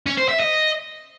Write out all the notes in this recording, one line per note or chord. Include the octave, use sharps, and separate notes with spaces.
C#4
C5
E5
D#5